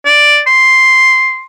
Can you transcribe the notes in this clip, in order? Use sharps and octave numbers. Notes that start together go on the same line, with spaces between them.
D5
C6